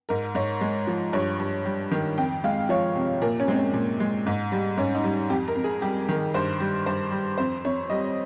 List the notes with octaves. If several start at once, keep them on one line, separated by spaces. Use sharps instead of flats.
G#2 A#4
G#2 C#5
G#3
F3
G2 C#5
G2
G3
D#3
F2 G5
G#3 F5
F3 C#5
C3
A#2 A#4
C#4
G#3 C4
C#4
A#2
G#3
G#2
G3
G#2 C#4
D#4
G3
F2 G4
A#4
F2
G#4
G3 G4
D#3
G2 C5
G3
G2 C5
G3
F2 C5
F2 C#5
G3 D#5